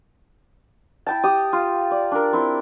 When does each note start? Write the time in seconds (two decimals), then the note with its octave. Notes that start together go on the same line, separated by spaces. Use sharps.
1.07 E4 G5 A5
1.23 G4 D#6
1.53 F4
1.91 D5
2.11 D4 A#4
2.33 C4 E4